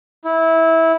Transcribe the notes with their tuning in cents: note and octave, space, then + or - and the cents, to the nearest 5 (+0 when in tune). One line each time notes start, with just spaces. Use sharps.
E4 -20